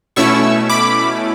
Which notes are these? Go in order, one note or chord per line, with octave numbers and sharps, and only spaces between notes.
B2 A3 C#4 E4 C#6 E6
B5 D6